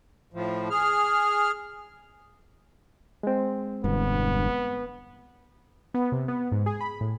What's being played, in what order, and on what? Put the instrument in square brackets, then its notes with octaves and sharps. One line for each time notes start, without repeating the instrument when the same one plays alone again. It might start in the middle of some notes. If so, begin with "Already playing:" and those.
[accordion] A2 F3
G#4 F6
[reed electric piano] G#3 C4
[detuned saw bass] E1 [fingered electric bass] G2 D3 [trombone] B3
[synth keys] B3
C3
B3
G#2
G#4
B5
A2